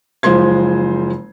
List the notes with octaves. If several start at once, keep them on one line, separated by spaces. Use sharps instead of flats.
F#1 F3 G#3 C5 C6 G#6